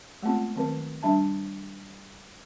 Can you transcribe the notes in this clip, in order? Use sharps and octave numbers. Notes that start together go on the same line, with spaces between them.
G#3 A3 B3 C4 F4
D#3 F#3 C4 A#4 B4
G3 D4 E5 A5